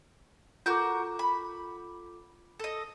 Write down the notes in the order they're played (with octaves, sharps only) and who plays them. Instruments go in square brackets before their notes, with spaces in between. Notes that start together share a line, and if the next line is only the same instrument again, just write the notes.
[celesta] F4 A4 D6 [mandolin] F#4 A#4 G6
[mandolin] B5
A4 D#5